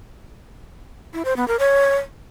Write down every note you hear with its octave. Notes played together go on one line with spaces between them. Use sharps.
E4
C5
B3
A#4
C#5